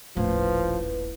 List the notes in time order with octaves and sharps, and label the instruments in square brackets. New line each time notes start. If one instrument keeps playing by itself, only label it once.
[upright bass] D#1 A#1 [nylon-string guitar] A2 [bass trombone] F3 [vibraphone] B4